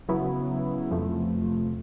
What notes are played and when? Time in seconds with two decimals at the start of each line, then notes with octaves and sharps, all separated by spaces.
0.09 C#3 F#3 B3 E4
0.91 F2 C3 F3 A3